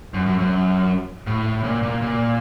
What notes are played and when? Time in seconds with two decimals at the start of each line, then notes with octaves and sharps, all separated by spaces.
0.14 F#2
0.26 F#2
0.39 F#2
1.27 A2
1.63 A#2
1.83 A#2
2.02 A#2